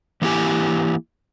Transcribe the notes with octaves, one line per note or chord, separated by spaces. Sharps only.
E3 A#3 E4 G4 G#5